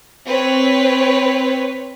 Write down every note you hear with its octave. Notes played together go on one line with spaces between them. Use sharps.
C4 B4 C#5